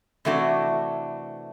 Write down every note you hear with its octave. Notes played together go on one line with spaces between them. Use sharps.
C3 E3 A3 D4 F#4